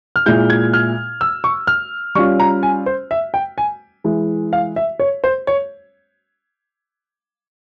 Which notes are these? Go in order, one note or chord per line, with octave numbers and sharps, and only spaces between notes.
F6
A#2 G#3 E4 G6
G#6
F6
E6
C#6
F6
G3 C#4 F4 C#6
A#5
G#5
C5
E5
G5
G#5
E3 G#3 E4
F5
E5
C#5
C5
C#5